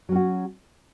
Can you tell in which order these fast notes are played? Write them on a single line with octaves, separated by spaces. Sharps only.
F#3 C#4 F#4